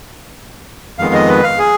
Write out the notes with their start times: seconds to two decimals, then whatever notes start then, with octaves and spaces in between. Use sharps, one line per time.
0.98 F2 D#3 G#3 B3 F5
1.14 D#5
1.29 B4
1.43 F5
1.59 G#4